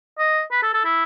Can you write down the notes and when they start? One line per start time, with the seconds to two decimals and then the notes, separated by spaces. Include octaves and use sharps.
0.19 D#5
0.52 B4
0.63 A4
0.74 A4
0.85 E4